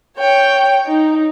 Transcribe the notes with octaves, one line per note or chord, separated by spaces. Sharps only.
C#5 G5
D#4